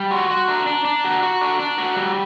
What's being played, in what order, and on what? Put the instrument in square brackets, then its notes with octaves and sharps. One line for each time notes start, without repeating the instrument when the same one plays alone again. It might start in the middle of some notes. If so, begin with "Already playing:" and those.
Already playing: [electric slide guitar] G3
[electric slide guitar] F#4 [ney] C6
[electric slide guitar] F#4 [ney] C6
[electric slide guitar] D4 [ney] A#5
[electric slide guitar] D4
D4
F#4
F#4
D4
D4
F#4
G3